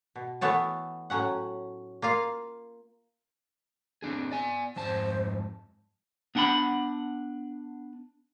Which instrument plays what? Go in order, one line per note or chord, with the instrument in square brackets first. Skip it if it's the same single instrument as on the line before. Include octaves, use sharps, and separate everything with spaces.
[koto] B2
E3 A3 B3 C#5 A5
A2 F#3 C#4 F#5
A#3 F4 F5
[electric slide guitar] C4 D4 G#4
[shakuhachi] B3 [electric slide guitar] D5 G#5
[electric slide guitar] F2 G#2 A5 [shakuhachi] C5
[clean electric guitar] B3 D4 F#5 G5 B5